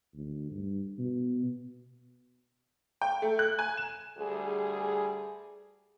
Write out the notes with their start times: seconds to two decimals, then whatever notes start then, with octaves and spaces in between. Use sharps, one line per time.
0.14 D2
0.51 G2
0.98 B2
3.02 G5
3.22 A3
3.39 F#6
3.59 G#5
3.77 E7
4.18 D2 G3 G#4